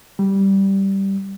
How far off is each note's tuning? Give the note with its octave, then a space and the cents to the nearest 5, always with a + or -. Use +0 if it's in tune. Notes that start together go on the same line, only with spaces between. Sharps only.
G3 -10